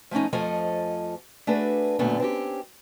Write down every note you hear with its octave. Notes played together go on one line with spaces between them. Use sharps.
F3 A3 A#3 C#4 D#4
F2 F3 A3 A4 D#5 G#5
A3 D4 F#4 G#4 B4
F#2 A#2 D3 A3 B3
C4 C#4 F#4 G4